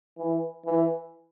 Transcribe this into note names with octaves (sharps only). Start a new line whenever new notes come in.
E3
E3